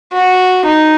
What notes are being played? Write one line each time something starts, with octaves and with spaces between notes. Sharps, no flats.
F#4
D#4